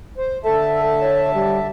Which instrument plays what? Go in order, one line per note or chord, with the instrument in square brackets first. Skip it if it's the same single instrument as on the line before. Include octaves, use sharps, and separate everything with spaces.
[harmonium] C5
[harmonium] D3 E5 A5 [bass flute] A4
[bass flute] C#5
G3